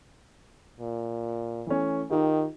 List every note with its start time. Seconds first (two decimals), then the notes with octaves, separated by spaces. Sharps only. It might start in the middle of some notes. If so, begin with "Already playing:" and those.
0.80 A#2
1.67 E3 A3 C#4
2.11 D#3 D#4 F4 G4